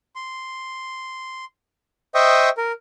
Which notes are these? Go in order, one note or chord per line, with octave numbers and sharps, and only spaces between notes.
C6
C5 D#5 E5 G5 C#6 D#6
A#4